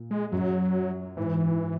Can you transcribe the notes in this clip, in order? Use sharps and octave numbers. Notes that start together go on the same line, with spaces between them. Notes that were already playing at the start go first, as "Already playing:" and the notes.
Already playing: A#2
G#3
F#2 F#3
G#2 E3